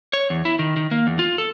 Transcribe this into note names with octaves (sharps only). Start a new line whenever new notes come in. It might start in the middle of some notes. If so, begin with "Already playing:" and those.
C#5
E2
E4
D#3
D#3
A#3
E2
F4
A4